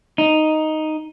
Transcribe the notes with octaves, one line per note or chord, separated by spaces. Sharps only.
D#4